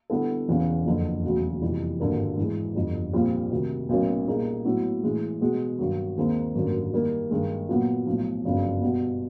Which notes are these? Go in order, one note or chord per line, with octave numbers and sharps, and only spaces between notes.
D3 G3 B3 E4 A4
E1 E2 C#3
F#1 F2 D3 F3
E1 D2 C#3 F#3
F2 C3 E3 G3
G#1 G2 D3 G3 A#3
G#2 E3 G#3
G1 F2 D3 G3
A#1 A#2 G3 C4 F4
D2 C3 D#3
B1 A2 F#3 A#3 C#4
A#2 G3 A#3 D#4 G#4
A2 F#3 B3 E4
A2 E3 G#3
B2 G#3 B3
G2 D#3 F#3
D#2 D#3 G#3 C4 D#4
G#1 F#2 D3 G3 A#3
D#3 G3 A#3 D#4
G2 D#3 G#3
A#2 F#3 B3
B1 A2 F3
G1 F#2 C#3 F3
B2 G3 B3